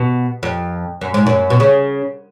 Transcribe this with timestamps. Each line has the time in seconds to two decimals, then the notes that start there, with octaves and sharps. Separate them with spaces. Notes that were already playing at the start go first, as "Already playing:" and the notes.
Already playing: B2
0.43 F2
1.01 F#2
1.14 G#2
1.26 F#2
1.50 B2
1.60 C#3